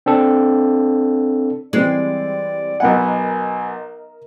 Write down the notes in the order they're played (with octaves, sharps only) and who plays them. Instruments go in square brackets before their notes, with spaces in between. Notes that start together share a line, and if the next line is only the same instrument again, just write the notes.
[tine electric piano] C4 D4 A4
[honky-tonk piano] E3 G3 C4 [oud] G#3 [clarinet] D5
[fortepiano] B1 B3 F#5 [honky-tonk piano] A#4 D#5 [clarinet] G#5